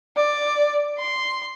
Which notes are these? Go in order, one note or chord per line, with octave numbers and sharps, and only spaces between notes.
D5
C6